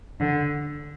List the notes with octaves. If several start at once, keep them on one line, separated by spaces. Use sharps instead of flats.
D3